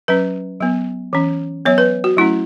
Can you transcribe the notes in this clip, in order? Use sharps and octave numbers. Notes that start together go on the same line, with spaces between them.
F#3 C#4 B4
F#3 B3
E3 C#4
F#3 B3 C#5
B4
F#4
F#3 A3 C#4 E4